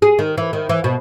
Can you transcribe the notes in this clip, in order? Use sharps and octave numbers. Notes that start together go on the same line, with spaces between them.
G#4
D#3
E3
D#3
E3
B2